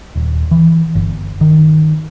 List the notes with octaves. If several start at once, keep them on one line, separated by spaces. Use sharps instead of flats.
D#1
E3
G1
D#3